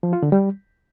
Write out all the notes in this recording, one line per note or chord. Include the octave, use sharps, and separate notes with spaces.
F3
F4
D3
G3